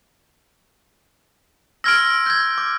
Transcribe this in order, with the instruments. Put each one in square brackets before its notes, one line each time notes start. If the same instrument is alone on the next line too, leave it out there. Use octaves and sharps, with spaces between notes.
[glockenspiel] C6 G#6 A#6 [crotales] E6 F6 D7
[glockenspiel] G6 G#6
D6